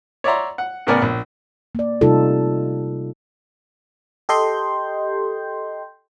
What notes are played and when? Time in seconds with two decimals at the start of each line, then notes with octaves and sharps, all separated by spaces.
0.24 C#5 D5 E5 F#5 A#5 C6
0.58 F#5
0.87 A2 C#3 B3 A#4 D5 G#5
1.02 A#1
1.75 A#3 D5
2.01 C3 G3 D#4 F4 A4
4.29 G4 A4 D#5 G5 C6 G6